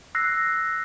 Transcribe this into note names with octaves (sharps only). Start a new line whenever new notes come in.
E6 F#6 A#6 C7